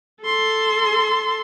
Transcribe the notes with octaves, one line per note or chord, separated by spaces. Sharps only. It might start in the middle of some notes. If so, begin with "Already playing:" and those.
A4 C6